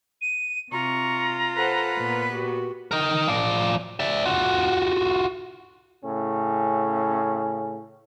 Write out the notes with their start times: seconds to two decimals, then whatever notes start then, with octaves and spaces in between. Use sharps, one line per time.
0.21 D#7
0.72 C3 F4 A#5 C#6
1.56 A4 B4 C5 F#5
1.97 A#2 B3
2.31 F#4 G4
2.91 D#4 A#4
3.28 F3 D5
4.00 D5 E5
4.26 F4 F#4
6.05 A2 C#3 C#4